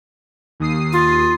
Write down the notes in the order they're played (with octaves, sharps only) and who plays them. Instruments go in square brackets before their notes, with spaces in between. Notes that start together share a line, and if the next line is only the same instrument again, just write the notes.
[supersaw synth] D#2 D#6 C7
[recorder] F4